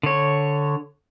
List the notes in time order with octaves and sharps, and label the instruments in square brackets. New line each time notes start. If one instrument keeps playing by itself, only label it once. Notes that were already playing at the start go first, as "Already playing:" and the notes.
[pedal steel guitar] D3 C#5